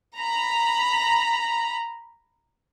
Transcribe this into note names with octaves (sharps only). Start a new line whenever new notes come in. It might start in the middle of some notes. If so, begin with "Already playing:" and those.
A#5 B5